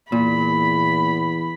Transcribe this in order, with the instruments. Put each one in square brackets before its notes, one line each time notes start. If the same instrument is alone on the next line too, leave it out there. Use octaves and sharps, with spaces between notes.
[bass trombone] E2 [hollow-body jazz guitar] A#2 [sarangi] B5